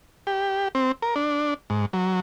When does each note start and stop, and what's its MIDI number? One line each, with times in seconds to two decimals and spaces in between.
0.27 0.68 67
0.75 0.92 60
1.02 1.15 70
1.16 1.54 62
1.70 1.86 44
1.93 2.20 54